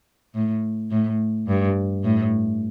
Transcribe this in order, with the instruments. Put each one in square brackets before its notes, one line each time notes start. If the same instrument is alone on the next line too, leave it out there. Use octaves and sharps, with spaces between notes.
[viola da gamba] A2
A2
G2
A2